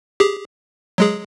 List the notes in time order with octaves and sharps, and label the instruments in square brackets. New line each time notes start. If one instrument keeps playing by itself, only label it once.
[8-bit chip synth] G4 G#4
F#3 G#3 G#4